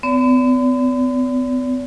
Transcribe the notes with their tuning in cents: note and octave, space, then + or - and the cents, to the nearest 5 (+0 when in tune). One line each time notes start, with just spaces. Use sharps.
B3 +45 D5 -45